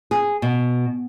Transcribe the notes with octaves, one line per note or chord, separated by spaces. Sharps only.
G#4
B2